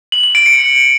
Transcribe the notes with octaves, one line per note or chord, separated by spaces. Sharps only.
F#7
F#7
D7
C#7